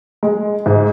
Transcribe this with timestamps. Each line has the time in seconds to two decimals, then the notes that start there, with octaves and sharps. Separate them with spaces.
0.23 G#3
0.66 G#2